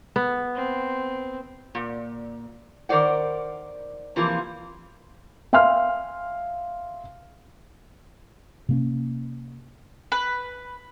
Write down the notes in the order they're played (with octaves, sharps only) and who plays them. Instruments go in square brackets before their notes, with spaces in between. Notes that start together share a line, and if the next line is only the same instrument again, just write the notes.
[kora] B3
[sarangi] C4
[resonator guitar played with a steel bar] A#2
D#3 A#4 C5 D5 F#5
C3 E3 F3 A#3 E4 F4
[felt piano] E5 F5 G#5 C6 F6
[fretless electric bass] C3 A#3 C#4
[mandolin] B4